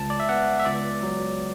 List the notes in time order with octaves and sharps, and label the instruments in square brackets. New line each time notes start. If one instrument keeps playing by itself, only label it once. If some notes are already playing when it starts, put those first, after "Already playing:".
Already playing: [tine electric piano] C#2 A5
D5
E5
B3 F#5
E5
C#2 D5
F#3